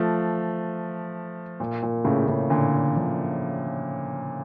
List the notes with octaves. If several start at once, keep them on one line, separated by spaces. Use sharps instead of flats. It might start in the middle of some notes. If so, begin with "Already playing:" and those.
Already playing: F3 A3
A#2
A#2
A2 C#3
A2 C#3
A#2 D3
D3 F3